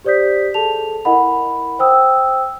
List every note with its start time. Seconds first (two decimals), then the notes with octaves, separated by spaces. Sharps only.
0.04 G4 C5 D5 D#6 G6 B6
0.54 G#4 A4 A5 F7
1.05 E4 A#4 D#5 F#5 B5
1.79 C5 G5 D#6 E6